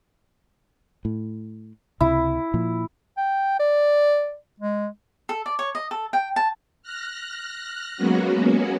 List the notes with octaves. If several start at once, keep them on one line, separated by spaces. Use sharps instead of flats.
A2
C#2 C3 E4
A#2 F3
G5
D5
G#3
A4
D5
C#5
D#5
A4
G5
A5
F6 F#6 A#6
F#3 G#3 A#3 B3 C#4 F#4